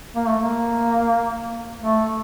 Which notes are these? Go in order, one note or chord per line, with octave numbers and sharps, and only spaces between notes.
A#3
A3
A#3
A3